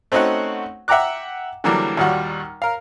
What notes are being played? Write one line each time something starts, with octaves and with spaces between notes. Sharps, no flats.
A3 C4 C#4 D#4 F#4 F#5
E5 F#5 G5 A#5 D6 F#6
D3 E3 F#3 G3 A#3 D4
D#2 A#2 D#3 G3 F#4 F#5
A#4 F5